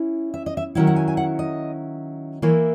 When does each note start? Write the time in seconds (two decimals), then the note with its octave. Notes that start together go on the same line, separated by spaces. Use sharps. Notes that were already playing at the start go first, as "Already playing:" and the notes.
Already playing: C#4 E4
0.34 E5
0.46 D#5
0.57 E5
0.75 D#3 F#3 C#4 E4 F#5
0.87 F#5
0.96 G#5
1.08 G#5
1.17 F#5
1.39 D#5
2.42 E3 A#3 E4 C#5